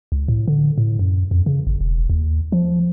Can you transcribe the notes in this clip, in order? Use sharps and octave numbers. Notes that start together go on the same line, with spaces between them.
C#2
A2
D3
A2
F#2
F2
C#3
G#1
E1
D#2
F3